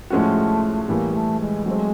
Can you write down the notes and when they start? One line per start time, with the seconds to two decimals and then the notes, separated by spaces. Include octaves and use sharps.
0.10 A2 F3 G#3 A3 C#4 F#4
0.88 A2 E3 G3 A#3
1.14 A3
1.40 G#3
1.66 F#3 G#3 A3 C4